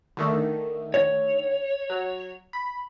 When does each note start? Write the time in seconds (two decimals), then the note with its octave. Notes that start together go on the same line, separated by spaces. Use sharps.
0.17 D3 D#3 A3
0.94 C#5
1.90 F#3
2.53 B5